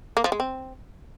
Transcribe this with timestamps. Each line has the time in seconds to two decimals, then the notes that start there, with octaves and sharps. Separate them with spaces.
0.17 A#3
0.24 F3
0.32 G#3
0.40 C4